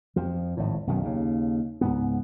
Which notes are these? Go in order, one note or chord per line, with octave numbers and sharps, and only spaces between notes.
F2 F3
G#1 A2
B1 F#2 D#3
D#2 C#3
C#2 G#2 B3